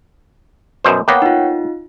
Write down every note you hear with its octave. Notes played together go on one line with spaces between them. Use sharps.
F#2 B2 C5
A#3 B3 C#5 F#5 G5
D#4 F4